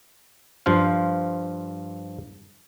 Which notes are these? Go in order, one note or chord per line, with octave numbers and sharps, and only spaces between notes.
G2 F3 C5 F5